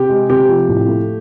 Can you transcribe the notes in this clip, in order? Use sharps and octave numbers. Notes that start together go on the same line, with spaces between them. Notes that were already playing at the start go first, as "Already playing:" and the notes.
Already playing: C3 G4
G#3
C3 G4
F3
A2
A3